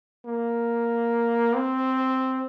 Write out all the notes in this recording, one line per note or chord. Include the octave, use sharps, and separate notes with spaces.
A#3
C4